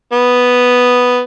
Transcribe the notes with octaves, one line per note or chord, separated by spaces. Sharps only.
B3